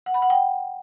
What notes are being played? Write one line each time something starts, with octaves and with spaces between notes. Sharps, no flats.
F#5
B5
F#5
G5